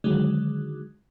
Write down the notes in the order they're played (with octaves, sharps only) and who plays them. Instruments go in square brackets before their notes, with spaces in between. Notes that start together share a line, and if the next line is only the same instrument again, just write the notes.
[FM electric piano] D3 D#3 F#3 G#3